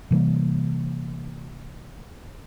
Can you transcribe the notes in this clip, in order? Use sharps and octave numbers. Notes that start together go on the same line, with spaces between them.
C3 E3 G3 A#3